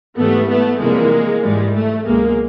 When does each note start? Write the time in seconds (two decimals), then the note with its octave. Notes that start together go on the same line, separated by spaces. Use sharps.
0.18 G#2 E3 G3 A3 B3
0.50 A3 B3
0.81 F2 C3 E3 G3 G#3 A#3
1.44 G#2 E3 G3 G#3
1.75 A3
2.06 C#2 B2 F#3 G#3 A#3